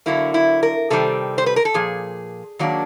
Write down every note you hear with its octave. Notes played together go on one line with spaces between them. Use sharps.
D3 F#3 A#3 E4
E4
A#4
C3 D#3 G3 C4 A4
C5
B4
A#4
A4
A#2 F3 G#4
D#3 F#3 A#3 D4